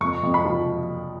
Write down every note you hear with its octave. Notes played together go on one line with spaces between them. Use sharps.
F2 C#6
F2
B5
F3